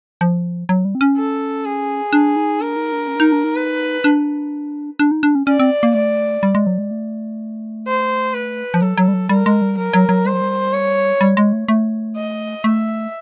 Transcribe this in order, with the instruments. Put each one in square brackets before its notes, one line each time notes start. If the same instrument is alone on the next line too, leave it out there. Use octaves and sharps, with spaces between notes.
[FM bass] F3
F#3
G3
C4
C#4
[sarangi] A4
G#4
[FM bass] D4
D#4
[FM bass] D4 [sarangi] A#4
[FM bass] D#4
D4
C#4
D4
D#4
D4
D#4
[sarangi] B4
[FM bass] D4
D4
D#4
D4
C#4
[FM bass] C#4 [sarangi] D5
[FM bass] C4
A#3
[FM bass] A3 [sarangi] D5
[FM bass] G3
G#3
F#3
G#3
A3
[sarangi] C5
B4
[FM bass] F3
[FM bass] F#3 [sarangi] A4
[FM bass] F#3
G3
F#3
[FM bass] G3 [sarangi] A#4
[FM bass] G#3
G3
[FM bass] F#3 [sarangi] A#4
[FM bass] F#3
F#3
[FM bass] G3 [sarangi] C5
[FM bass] F#3
G3
[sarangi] C#5
[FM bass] G3
G#3
A3
A3
[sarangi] D#5
[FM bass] A3 [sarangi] E5